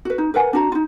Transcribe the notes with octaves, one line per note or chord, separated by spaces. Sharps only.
F#4 B4
D#4
A#4 B4 F#5 G#5
D4 F#4 A#5
D#4 F4